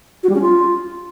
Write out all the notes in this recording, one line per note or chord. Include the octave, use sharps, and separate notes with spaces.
F#4
G3
C#4
F4